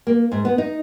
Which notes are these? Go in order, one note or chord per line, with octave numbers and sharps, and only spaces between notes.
A#3
G#2
B3
D#4